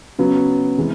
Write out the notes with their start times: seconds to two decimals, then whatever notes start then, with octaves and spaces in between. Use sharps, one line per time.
0.19 C#3 F#3 B3
0.78 C3 E3 G#3